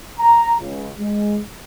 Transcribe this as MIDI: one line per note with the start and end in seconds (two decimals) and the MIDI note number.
0.20 0.55 82
0.60 0.90 37
0.99 1.39 56